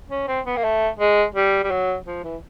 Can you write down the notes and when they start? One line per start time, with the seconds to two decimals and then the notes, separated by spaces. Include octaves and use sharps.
0.11 C#4
0.28 C4
0.46 B3
0.57 A#3
0.64 A3
0.99 G#3
1.35 G3
1.64 G3
1.71 F#3
2.07 F3
2.24 E3